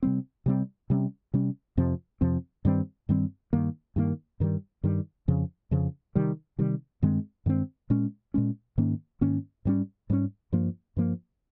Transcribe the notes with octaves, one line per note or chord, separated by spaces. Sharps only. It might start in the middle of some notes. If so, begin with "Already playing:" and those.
C3 G3 C4
C3 G3 C4
C3 G3 C#4
C3 G3 C#4
F2 C3 F3 C4
F2 C3 F3 C4
G2 D#3 G3 C4
G2 D#3 G3 C4
G2 D#3 A#3
G2 D#3 A#3
G2 D#3 G3
G2 D#3 G3
F2 C#3 F3
F2 C#3 F3
C3 D#3 G3
C3 D#3 G3
G2 D#3 G#3 C4
G2 D#3 G#3 C4
A#2 G#3 C#4
A#2 G#3 C#4
G#2 D#3 A#3 C#4
G#2 D#3 A#3 C#4
G#2 G3 A#3 C#4
G#2 G3 A#3 C#4
G2 F3 A#3
G2 F3 A#3